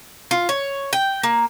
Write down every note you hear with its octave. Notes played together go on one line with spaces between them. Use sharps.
F4
C#5
G5
A#3